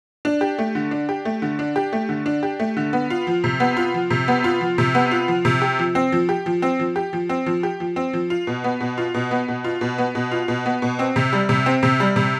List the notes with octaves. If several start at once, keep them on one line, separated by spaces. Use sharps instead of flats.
D4
G4
A3
D3
D4
G4
A3
D3
D4
G4
A3
D3
D4
G4
A3
D3
B3
F4
F3
C3
B3
F4
F3
C3
B3
F4
F3
C3
B3
F4
F3
C3
G4
F3
C4
F3
G4
F3
C4
F3
G4
F3
C4
F3
G4
F3
C4
F3
F4
B2
B3
B2
F4
B2
B3
B2
F4
B2
B3
B2
F4
B2
B3
B2
C4
C3
G3
C3
C4
C3
G3
C3